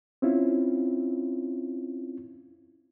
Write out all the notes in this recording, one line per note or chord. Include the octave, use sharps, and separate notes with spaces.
C4 C#4 E4 F4